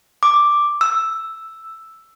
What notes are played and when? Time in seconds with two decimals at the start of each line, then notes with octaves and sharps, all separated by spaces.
0.23 D6
0.81 E6